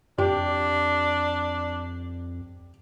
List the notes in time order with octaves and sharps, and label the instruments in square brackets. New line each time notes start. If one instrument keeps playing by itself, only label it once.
[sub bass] F2 [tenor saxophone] D4 [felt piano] G4